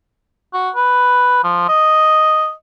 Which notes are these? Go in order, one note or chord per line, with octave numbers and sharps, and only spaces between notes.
F#4
B4
F3
D#5